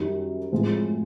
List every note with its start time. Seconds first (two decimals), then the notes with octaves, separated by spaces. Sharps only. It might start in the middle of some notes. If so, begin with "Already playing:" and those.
Already playing: F#2 D#3 G3
0.52 A2 F3 G#3 C4